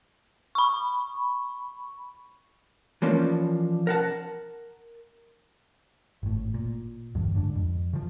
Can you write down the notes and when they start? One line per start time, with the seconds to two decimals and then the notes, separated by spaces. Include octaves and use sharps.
0.55 B5 C#6
3.02 E3 F3 A#3 C#4 D4
3.87 A#4 F#5 A5
6.23 G#1 A2
6.54 A#2
7.15 G1 E2 G2
7.35 G#2 D3
7.55 F2
7.93 C#3 F3